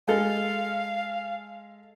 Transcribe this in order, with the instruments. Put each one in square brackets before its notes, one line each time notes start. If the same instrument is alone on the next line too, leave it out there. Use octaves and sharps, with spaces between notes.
[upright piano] G#3 A4 [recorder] F5